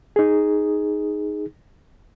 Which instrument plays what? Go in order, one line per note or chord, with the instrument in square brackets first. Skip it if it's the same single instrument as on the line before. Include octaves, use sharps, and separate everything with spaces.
[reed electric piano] D#4 G#4